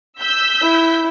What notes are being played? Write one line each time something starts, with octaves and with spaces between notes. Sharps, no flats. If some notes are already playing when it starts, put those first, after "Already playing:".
E6 G6 B6
E4